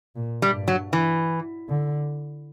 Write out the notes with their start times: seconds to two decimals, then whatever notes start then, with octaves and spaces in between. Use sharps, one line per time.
0.16 A#2
0.42 G3
0.54 G2
0.68 F#3
0.93 E3
1.69 D3